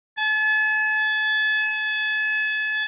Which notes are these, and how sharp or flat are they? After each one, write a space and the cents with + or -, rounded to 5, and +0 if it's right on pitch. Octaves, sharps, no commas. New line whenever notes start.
A5 -40